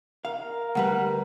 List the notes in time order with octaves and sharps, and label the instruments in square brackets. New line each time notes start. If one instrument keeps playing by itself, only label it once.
[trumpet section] A#4 [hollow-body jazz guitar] F5
[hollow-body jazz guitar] D2 G3 B4 [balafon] F#5